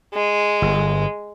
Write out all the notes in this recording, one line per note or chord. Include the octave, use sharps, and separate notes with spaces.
G#3
G1